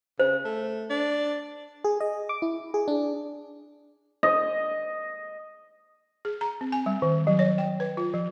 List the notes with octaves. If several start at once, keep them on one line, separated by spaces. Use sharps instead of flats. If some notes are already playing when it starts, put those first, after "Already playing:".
C#3 C5
A3
D4
G#4
D#5
D6
E4
G#4
D4
D#5
G#4
A#5
C4
G#5
G3
D#3
F#3
C#5
G5
B4
F4
F3